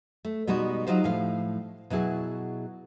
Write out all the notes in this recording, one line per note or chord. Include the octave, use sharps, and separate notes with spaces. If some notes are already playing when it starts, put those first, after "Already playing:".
A3
B2 G3 G#3 D#4 F#4
F#3 D#4 F4 G4 C5
A2 F3 F5
B2 F#3 E4 G#4